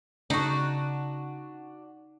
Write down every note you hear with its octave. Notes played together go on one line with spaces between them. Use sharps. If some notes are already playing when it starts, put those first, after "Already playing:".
C#3 D4 D#4 F#4